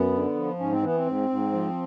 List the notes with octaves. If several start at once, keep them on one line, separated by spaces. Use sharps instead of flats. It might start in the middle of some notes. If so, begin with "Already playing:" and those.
Already playing: F#2 B3
D3
F3
G#2 C#4
C4
E3 B3
C4
G#2
G#2
F3